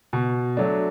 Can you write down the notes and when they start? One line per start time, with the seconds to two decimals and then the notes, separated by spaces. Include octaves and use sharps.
0.13 B2
0.57 F#3 A3 D4